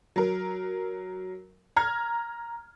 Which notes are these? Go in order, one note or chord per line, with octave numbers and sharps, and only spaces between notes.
F#3 A#4
A#5 F6 G#6